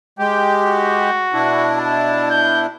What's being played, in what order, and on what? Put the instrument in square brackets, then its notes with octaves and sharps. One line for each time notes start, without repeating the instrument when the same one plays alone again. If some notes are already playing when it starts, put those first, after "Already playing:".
[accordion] G#3 G4 [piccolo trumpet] G5
[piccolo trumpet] F#4
[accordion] B2 D4 E4
[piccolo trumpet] A5
G6